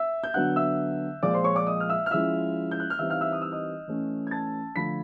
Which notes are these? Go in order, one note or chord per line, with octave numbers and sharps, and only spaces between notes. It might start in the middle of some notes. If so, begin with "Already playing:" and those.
Already playing: E5 E6
G6
D3 F#3 B3 D4 F#5 F#6
E5 E6
A#2 F3 G#3 D5 D6
C5 C6
C#5 C#6
D5 D6
D#5 D#6
F6
E5 E6
F6
F3 G#3 C#4 E4 E5 E6
G6
F#6
F6
E3 G3 C4 D#4 E5 E6
F5 F6
E5 E6
D#6
E6
D#5 D#6
E3 A3 C#4
G#6
A5 A6
D3 F3 A3 B5 B6